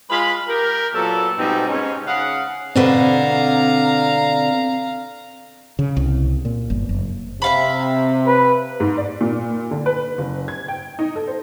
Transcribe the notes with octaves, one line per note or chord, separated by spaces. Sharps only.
G#3 F4 B5
G4 A#4
A#2 F#3 B3 A4
G#2 B2 G3 C4 D#4
G#2 C#4
C#3 F5 F#5
B2 D3 C4 B4 F5 A#5
C#3
C2
A#2
G1
F#1
C3 E5 F5 B5
B4
G#2
D5
A#2
D3
B4
F#1
G#6
G5
D#4
A4
C5